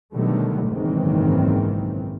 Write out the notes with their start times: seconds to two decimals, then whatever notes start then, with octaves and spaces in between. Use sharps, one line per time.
0.14 B2 D3 D#3 F#3 G3 A3
0.67 F#1 B1 G#2 D#3 E3 C4